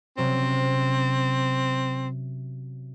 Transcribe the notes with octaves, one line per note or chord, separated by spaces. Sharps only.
C3 F#3 C4 C#4